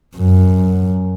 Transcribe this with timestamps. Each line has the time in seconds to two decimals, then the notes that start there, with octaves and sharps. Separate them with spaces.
0.17 F#2